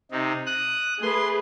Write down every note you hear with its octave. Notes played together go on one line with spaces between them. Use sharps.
C3 D#4
D#6 F#6
A3 G#4 B4 C6